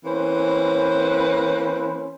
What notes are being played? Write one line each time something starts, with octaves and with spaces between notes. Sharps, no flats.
E3 A#3 C4 C#4 B4 C5